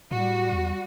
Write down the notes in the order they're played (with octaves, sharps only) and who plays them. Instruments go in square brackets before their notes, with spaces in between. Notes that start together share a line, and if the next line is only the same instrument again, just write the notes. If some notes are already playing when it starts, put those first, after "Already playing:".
[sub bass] A2 [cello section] G3 F#4
[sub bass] E2